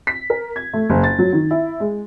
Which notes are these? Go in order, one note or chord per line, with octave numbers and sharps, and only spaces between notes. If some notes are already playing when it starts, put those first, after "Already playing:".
B6
A#4
G#6
A3
F#1
A6
F#3
D#3
E4
G#3